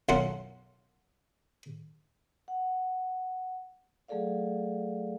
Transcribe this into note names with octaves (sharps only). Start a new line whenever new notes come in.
B1 F#2 F4 F#5
F#5
F#3 A3 G#4 A4 D5 F5